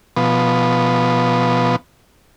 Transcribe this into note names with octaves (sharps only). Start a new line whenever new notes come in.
B2 F3 B3